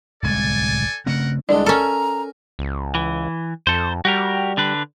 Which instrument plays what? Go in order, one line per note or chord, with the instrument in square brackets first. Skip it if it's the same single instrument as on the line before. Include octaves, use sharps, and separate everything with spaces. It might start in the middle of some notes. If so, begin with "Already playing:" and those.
[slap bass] D1 C2 G#3 [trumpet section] A4 D5 G#5
[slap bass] C#3 A3 C4 [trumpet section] A#4 F#5
[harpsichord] C2 D3 G#3 [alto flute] D4 [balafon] D5
[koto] C#4 A4 [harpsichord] A#4 G#5 [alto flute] A#5
[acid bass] C#2
[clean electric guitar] E3
[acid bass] F2 [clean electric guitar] A4 C5
[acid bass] G3 [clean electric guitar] F#4 G4 A#4
[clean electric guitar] D3 D4 B4